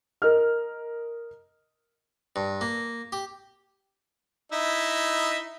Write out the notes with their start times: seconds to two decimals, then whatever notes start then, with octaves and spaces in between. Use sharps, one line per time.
0.22 A#4 D#5 F6
2.36 G2
2.61 A#3
3.12 G4
4.52 D#4 E4 E5